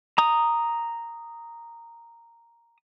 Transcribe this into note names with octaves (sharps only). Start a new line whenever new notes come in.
A#5 D#6